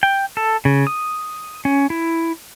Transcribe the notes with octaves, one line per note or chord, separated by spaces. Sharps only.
G5
A4
C#3
D#6
C#4
E4